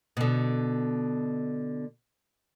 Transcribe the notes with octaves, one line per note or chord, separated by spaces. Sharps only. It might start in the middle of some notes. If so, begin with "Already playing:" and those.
B2 D3